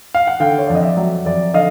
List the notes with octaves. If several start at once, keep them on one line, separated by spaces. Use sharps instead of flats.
F5
F#5
D3 F5 G5
C#5
F2 D5
D#5
D5 E5
F#3
F2 D5 E5
D3 D#5 F5